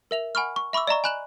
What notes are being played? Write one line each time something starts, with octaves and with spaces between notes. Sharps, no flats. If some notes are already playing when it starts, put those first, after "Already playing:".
A#4 E5 F7
F#5 G#5 B5 C#6 F6
C#6
E5 B5 C#6 D6 E6
D5 D#5 A#5 C#6
G#5 B5 F#6 E7 F#7